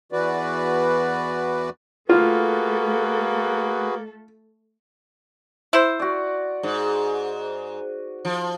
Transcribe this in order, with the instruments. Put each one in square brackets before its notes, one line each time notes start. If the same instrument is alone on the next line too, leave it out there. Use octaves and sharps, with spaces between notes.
[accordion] E2 E3 F#4 B4 D5
[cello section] A3 A4 [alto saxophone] A#3 [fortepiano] F4 [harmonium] F#4 G#4 B4
[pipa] E4 C5
[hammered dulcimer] F#4 D5
[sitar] G#2
F3